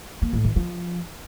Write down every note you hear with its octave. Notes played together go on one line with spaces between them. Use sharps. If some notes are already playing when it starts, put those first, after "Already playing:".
A#3
A2
E3
F3